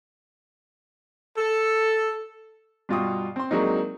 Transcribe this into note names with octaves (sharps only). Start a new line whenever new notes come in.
A4
G2 B2 F4 F#4 G5 D#6
C4 C6
F#3 G#3 A#3 C4 D4 D#4